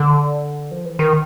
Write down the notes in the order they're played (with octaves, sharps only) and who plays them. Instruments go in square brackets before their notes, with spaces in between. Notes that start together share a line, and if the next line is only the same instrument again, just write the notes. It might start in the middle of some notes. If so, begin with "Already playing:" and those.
Already playing: [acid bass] D3
F3
E3
D#3